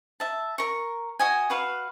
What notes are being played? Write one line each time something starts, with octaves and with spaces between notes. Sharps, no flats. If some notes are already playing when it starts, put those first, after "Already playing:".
E5 A5
A#4 C#6
F#4 D#5 G#5
F#4 B4 F5